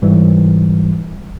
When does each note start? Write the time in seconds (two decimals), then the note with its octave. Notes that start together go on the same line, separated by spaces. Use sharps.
0.02 G#2 E3 G3